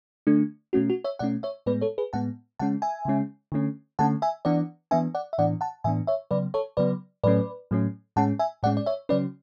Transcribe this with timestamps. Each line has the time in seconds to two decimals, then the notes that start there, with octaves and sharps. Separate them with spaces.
0.27 D3 A3 D4
0.73 B2 A3 C#4 F#4
0.90 F#4
1.04 C#5 E5
1.19 B2 A3 C#4 D5 F#5
1.43 C#5 E5
1.66 A2 G#3 B3 B4 D5
1.81 A4 C#5
1.98 G#4 B4
2.13 A2 G#3 B3 F#5 A5
2.59 C#3 G#3 C#4 F#5 A5
2.82 E5 G#5
3.05 C#3 G#3 C#4
3.52 D3 A3 C#4
3.99 D3 A3 C#4 F#5 A5
4.22 E5 G#5
4.45 E3 B3 D4 D5 F#5
4.91 E3 B3 D4 E5 G#5
5.15 D5 F#5
5.33 E5
5.38 A2 E3 B3 D4 D5 F#5
5.61 F#5 A5
5.84 A2 E3 B3 D4 E5 G#5
6.07 C#5 E5
6.31 C#3 F#3 B3 B4 D5
6.54 A4 C#5
6.77 C#3 F#3 B3 B4 D5
7.24 A2 F#3 A3 C#4 B4 D5
7.71 A2 F#3 A3 C#4
8.16 A2 G#3 C#4 F#5 A5
8.39 E5 G#5
8.63 A2 G#3 C#4 D5 F#5
8.77 D5
8.86 C#5 E5
9.09 C#3 F#3 C#4 B4 D5